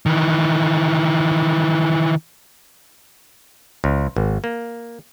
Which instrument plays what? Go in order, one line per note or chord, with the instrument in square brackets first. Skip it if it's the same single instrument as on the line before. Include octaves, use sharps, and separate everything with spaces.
[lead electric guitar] D#3 E3
[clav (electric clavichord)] C#2
G#1
A#3